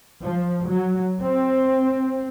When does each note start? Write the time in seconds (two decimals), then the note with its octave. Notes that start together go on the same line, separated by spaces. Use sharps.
0.23 F3
0.67 F#3
1.21 C4